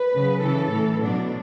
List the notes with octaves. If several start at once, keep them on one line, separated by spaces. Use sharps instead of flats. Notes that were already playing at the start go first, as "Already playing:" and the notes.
Already playing: B4
C#3 F#3
C#3 E3 A4
A2 E3
B2 F#3 D4